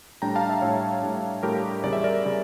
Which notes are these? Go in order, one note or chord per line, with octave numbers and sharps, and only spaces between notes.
A2 G3 D4 G5 A#5
F5 A5
E5 G5
A2 G3 D4 C#5 E5
A2 G3 D4
A2 G3 D4 G4 A#4
E2 C#3 G3 D5
E5
A#4 D5
C#3 G3